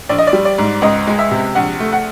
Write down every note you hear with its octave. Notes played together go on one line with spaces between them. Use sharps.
A#1 D5
D#5
D5
G3
D5
G#2
C#2 D#5
G#3
E5
C3
A#1 F#5
A3
F#5